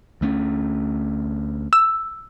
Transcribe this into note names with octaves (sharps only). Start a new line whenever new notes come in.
D2 A3 C#4
E6